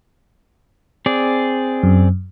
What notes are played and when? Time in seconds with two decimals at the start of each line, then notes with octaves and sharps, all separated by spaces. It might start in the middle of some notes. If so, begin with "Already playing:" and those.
1.06 C4 G#4 D5
1.83 F#2